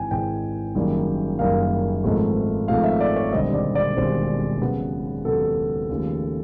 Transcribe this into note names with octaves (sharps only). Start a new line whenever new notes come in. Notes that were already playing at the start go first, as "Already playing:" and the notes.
Already playing: G#1 G#2 E3 G5 G#5
G#1 G#2 E3 G5
F#1 F#2 D#3 G3 A#3
F#1 F#2 D#3 G3 A#3 F5
G#1 G#2 F3 A3
G#1 G#2 F3 A3 F5
E5
D5
C#5
E1 D#2 D3 G3 C4 D#5
D5
D5
E1 D#2 D3 G3 C4 C5
D#2 C#3 F#3 B3 B4
D#2 C#3 F#3 B3 A4
D#2 C#3 F3 A3